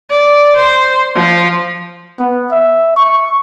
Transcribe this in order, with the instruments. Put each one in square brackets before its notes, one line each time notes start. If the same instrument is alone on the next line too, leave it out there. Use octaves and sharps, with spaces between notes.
[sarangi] D5
C5
F3
[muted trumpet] B3
E5
C#6